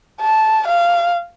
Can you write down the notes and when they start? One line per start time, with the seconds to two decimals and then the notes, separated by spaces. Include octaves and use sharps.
0.22 A5
0.68 F5